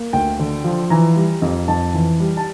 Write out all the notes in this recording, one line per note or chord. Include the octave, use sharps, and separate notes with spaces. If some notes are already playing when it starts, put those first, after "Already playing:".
Already playing: A#3
D2 G5
D3
F3
E3 A#5
G3
F2
F2 A5
E3
G3
A5